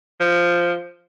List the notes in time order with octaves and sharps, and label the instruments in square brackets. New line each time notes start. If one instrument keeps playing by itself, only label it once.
[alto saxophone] F3